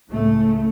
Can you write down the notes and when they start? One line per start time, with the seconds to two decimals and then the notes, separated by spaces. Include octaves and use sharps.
0.11 C#2 A2 C#3 A3